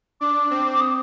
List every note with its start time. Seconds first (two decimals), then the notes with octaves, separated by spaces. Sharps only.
0.21 D4 D6
0.51 C4
0.72 D6
0.81 D#6